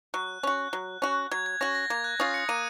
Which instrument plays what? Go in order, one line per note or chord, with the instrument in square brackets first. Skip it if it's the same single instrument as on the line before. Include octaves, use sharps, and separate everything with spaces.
[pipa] F#3 [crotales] F#6
[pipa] C#4 F#4
F#3
C#4 F#4
[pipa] F#3 [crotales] G#6
[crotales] G#6
[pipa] C#4 F#4 [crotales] A#6
[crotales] A#6
[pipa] A#3 [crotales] G#6
[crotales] F#6
[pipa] C#4 F4 [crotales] D#6
[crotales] C#7
[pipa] A#3 [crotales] D#7